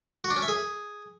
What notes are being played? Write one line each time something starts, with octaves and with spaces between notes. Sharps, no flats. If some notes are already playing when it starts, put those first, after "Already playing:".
F#4
D4
C#4
E5
G#4